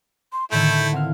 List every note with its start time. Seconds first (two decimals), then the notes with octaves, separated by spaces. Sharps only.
0.33 C6
0.52 A2 D3 D#3 A3 E4 G6
0.93 C4 E4 F5 F#5